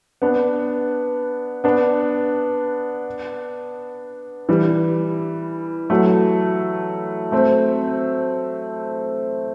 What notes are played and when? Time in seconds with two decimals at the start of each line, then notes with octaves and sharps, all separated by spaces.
0.22 B3 D4
1.64 B3 D4
4.49 E3 G3
5.90 F#3 A3
7.32 A3 C4